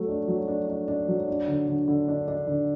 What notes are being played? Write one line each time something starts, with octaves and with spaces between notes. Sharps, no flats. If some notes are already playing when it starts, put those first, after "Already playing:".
Already playing: F#3 A3
D4
F#3
D4
D4
D4
F#3
D4
D3
D3
D3
D4
D4
D3